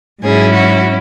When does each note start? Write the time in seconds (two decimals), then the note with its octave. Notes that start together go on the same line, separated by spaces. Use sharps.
0.23 G#2 F#3 C#4 E4 G#4
0.53 F#4